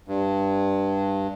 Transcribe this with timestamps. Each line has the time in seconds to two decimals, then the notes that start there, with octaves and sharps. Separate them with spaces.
0.08 G2